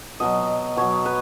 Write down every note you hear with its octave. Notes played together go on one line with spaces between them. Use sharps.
B2 F#3 D#5
B2 F#3 C#5
B4